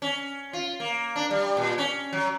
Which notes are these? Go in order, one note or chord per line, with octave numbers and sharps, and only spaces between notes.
C#4
F4
A#3
D4
G3
A#2
C#4
F#3